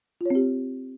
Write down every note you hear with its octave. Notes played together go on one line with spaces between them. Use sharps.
C4 F4 G4 C#5